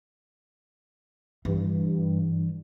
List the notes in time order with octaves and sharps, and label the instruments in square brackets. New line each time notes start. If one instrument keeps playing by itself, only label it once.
[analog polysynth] G2 [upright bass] E3